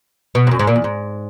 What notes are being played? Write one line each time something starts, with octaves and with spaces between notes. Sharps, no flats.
B2
G#2
F#2
G#2
A#2
E2
G#2